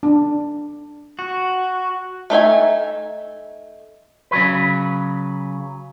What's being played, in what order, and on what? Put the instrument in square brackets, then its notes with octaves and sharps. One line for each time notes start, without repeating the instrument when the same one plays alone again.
[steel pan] D4
[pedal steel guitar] F#4
[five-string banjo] A3 D#4 E5 G#5
[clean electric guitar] C#3 F#3 B4